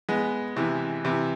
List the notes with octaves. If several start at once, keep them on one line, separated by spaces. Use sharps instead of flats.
G#3 B3
C3 E3
C3 E3